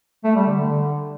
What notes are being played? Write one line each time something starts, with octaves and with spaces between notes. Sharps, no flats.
A3
G3
D3
D3